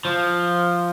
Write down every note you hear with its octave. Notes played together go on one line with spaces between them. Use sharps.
F3